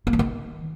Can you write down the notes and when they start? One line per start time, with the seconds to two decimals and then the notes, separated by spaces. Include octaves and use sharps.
0.07 A#3
0.13 E3
0.19 D#3